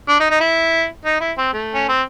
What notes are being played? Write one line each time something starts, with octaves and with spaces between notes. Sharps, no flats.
D4
D#4
D#4
E4
D#4
E4
C4
A3
C#4
C4